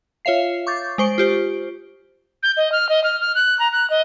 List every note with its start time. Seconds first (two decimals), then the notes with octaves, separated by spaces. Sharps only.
0.25 F4 C#5 E5 F5 C7
0.67 C#6 D6 G6 A6
0.98 G#3 C5 C#6 D7
1.18 F4 G4 C5
2.43 G6
2.57 D#5
2.72 F6
2.89 D#5
3.04 F6
3.21 F6
3.35 F#6
3.59 A#5
3.72 F#6
3.90 D#5